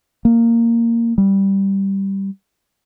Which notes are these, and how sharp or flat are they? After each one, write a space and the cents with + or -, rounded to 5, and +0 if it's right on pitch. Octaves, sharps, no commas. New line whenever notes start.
A#3 -10
G3 -5